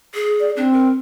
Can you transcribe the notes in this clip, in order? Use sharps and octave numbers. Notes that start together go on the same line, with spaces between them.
G#4
D5
C4 D4
A#4